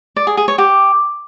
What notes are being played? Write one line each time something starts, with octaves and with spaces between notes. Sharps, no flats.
D5
G#4
G#4
C#5
G4